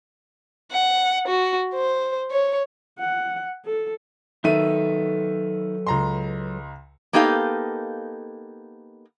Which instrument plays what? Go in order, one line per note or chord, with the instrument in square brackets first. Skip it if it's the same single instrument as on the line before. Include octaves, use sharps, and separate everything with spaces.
[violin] F#5
F#4
C5
C#5
[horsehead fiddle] F#5
A4
[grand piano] D#3 E5 D#7 [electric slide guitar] F#3 A4 B4
[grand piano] C#2 A#5 C6
[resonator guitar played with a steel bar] A#3 B3 D#4 G4 A4 F5